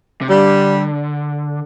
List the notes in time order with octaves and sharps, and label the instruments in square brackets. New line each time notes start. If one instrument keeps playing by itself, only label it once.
[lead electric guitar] C3
[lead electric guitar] D3 [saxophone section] G3